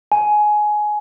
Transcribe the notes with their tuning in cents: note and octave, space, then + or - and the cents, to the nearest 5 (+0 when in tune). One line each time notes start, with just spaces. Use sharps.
G#5 +15